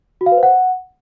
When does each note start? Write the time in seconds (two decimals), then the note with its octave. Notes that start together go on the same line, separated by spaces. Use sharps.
0.21 F#4
0.26 F5
0.32 B4
0.37 C5
0.43 F#5